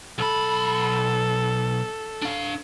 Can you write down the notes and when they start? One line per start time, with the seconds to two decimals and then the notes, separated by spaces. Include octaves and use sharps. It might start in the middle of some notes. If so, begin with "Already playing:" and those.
0.18 B1 A4 B5
2.22 D4 F5